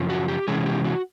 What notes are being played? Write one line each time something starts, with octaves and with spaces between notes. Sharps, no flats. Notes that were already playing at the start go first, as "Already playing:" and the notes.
Already playing: F#2 C#3 F3
F#4
G4
C3 E3 G#3 C#4 G#4
G4
F#4